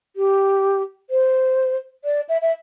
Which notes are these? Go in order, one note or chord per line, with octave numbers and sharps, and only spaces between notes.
G4
C5
D5
E5
E5